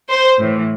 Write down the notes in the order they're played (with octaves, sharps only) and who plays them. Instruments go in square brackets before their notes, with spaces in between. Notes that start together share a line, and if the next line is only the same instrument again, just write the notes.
[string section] C5
A2 E3